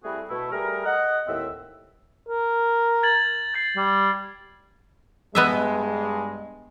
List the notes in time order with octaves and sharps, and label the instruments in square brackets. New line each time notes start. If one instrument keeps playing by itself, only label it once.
[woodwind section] G3 A3 C4 E4 F#4 G#4
B2 A3 E4
G3 A3 G#4 A#4
D#5 F#5
D#2 A2 C4 E5
[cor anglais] A#4
[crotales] G#6 A6 F#7
G6 A6 C7
[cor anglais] G3
[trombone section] G2 G#3 [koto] B3 D#5 E5